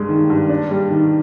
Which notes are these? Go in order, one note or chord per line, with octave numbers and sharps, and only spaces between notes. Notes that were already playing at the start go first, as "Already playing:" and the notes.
Already playing: G2 G#3
D#3
G2
D4
G3
D#3